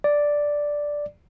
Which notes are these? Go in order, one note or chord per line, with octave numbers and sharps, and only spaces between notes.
D5